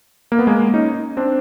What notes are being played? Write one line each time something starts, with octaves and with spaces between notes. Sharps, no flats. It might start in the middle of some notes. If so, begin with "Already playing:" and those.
A#3
B3
G#3 A#3
C#4 D#4
C4 D4